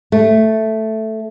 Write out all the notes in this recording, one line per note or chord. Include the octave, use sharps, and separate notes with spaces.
A3